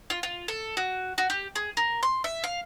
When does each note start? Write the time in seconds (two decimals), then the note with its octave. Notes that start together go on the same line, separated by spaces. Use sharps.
0.10 F4
0.23 F4
0.48 A4
0.77 F#4
1.18 F#4
1.30 G4
1.56 G#4
1.77 A#4
2.03 C6
2.24 E5
2.44 F5